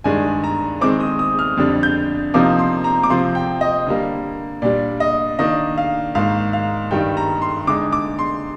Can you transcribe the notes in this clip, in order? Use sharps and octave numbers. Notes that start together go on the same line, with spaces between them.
G2 D#3 G#3 D4 G#5
A#5
D#3 G#3 C4 D6
D#6
D#6
F6
F2 D3 G3 D4
G6
C3 F3 A#3 D#4 D6
C6
A#5
D6
C3 F3 C4 C6
G5
D#5
D3 G3 A#3
A#2 G3 D4 D5
D#5
D#3 A#3 D4 D#5
F5
G#2 D#3 A#3 F5
F5
G2 D#3 G3 G5
A#5
C6
D3 G#3 D#4 D6
D6
C6